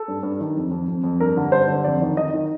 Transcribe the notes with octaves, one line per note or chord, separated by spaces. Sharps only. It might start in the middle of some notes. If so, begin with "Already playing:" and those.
Already playing: A4
G2
G2
D#3
F2
F2
F2
F2
G2 A#4
D3
G2 C5
D3
F2 D5
D#3
D#3 D#5
D#3